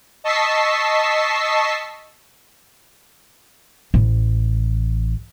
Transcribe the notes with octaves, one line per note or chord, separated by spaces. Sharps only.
D#5 A5 C#6 E6 B6 C7
A1